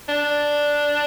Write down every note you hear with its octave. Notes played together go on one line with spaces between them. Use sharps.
D4